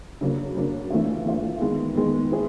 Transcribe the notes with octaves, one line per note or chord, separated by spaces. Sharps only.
C#3 F#3 A#3 D4
C#3 F#3 A#3 D4
E3 A3 D4 F4
E3 A3 D4 F4
D#3 G#3 B3
D#3 G#3 B3
B3 E4 G#4